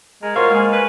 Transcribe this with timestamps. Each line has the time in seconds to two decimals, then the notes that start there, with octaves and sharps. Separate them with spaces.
0.23 G#3 A#4
0.36 F4 F#4 A#4 C5 C#5 F5
0.50 G#3 A#3 G#4
0.72 B4